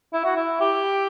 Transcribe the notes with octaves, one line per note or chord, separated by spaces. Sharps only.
E4
F#4
E4
G4